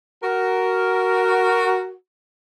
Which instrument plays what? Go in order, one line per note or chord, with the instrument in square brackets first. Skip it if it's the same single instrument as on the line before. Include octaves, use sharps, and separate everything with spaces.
[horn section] F#4 A#4